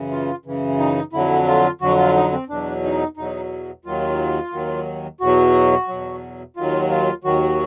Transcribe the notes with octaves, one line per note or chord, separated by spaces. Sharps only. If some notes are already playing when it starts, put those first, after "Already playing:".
Already playing: F#2 C#3 E3
F4
F#2 C#3 E3
D#4
F2 D3 F#3 E4
F4
F2 D3 F#3 F#4
F4
D#4
C4
E2 B2 F#3 D4
D#4
E2 B2 F#3 D#4
D#2 D#3 F#3 F4
D#2 D#3 F#3
E2 B2 F#3 F#4
E2 B2 F#3
D#2 D#3 F#3 F4
F4
D#2 D#3 F#3 F#4